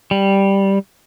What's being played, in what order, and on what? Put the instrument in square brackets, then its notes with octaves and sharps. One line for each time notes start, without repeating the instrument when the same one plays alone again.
[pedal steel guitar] G3